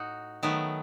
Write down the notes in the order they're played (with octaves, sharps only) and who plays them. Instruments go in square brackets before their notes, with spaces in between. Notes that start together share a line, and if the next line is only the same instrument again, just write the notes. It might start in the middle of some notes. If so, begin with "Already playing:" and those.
Already playing: [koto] A2 D#4 F#4
D#3 F#3 A3 B3